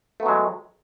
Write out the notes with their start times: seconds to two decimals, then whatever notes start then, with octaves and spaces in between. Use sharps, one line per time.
0.20 A3
0.23 B3
0.26 F#3
0.29 G#3